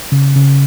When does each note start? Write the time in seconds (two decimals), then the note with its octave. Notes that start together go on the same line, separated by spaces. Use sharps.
0.12 C#3
0.36 C#3